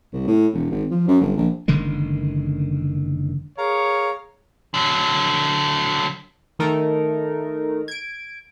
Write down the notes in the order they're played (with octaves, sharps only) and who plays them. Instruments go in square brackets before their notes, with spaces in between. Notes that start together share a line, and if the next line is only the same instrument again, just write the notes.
[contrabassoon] C2
A2
E1
G#1
F3
F#2
G1
A#1
[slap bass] F#1 D3 D#3 G#3
[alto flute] G#4 [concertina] A#4 F5 A#5 [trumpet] C#5
[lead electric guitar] D3 F#3
[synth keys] D#3 A3 D#4 A4 A#4
G#6 D7